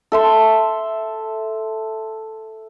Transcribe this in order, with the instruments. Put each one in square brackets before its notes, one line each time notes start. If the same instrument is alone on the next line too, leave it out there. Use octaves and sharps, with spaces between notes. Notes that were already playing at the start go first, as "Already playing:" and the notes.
[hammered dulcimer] A4 E5 C6